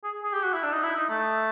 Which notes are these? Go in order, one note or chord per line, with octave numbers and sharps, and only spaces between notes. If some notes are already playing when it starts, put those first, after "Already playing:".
G#4
G#4
G4
F#4
E4
D4
D#4
E4
D#4
A3